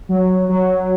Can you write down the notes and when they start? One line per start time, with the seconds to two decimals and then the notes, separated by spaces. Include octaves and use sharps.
0.09 F#3
0.49 F#3